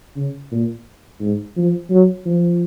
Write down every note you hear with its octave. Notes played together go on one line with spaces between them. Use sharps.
C#3
A#2
G#2
F3
F#3
F3